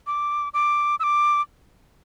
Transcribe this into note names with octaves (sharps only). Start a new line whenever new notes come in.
D6
D6
E6
D6